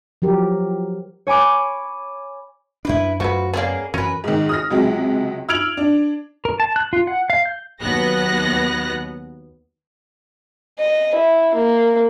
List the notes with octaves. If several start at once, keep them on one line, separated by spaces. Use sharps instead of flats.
F3 F#3 G4 A#4
C#5 G#5 B5 D6
F#2 D4 E4 G4 B4
F#2 F3 F#3 A3 F#4 B4
A#3 B3 C#4 G#4 D5
F#2 E3 F#3 C#4 A#4 B4
G#2 D#3
D#6 F6 A#6
C#2 C3 F#3 G#3
E6 F6 G#6 D7 F7 F#7
D4
A#4
A5
F#6
F4
F#5
F5
G6
D#2 F#3 B3 F#6 A#6
D#5
E4
A#3